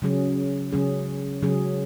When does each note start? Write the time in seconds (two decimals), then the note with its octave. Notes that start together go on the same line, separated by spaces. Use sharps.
0.02 C#3 F#3 C#4 G#4
0.72 C#3 F#3 C#4 G#4
1.42 C#3 F#3 C#4 G#4